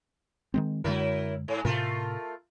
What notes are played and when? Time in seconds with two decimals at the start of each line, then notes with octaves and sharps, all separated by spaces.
0.54 D#3 G#3 C4
0.84 F#2 D3 F#3 G#3 E4 A#4
1.48 G#2
1.65 A2 C3 A3 F4 A#4